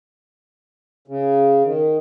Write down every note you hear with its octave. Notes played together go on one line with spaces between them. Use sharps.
C#3
D#3